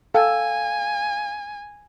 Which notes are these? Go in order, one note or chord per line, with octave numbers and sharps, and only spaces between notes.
A4 F5 G5 G#5